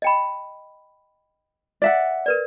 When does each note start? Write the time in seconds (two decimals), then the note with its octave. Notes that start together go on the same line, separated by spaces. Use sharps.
0.02 D#5 G5 B5
1.82 D5 E5 F#5
2.26 A#4 B4 D5